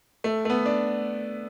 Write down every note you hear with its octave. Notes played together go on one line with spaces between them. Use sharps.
A3
A3
B3
D4